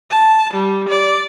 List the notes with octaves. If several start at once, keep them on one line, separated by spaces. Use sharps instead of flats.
A5
G3
D5